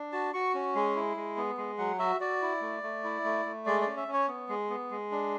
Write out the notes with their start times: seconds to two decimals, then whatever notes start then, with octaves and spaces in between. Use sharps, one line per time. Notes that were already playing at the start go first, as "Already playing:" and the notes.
Already playing: D4
0.12 F#4 A5
0.34 F#4 C#6
0.54 C#4
0.75 G#3
0.95 E4
1.17 G#3
1.37 B3
1.58 G#3
1.78 F#3 F#5
1.99 F#4 E5
2.20 F#4 D5
2.42 E4
2.62 A3
2.83 A3
3.04 E4
3.24 A3
3.46 A3
3.66 G#3 D5
3.81 D5
3.87 C#4
3.97 E5
4.08 C#4
4.13 C#5
4.28 B3
4.49 G#3
4.70 B3
4.91 G#3
5.12 D4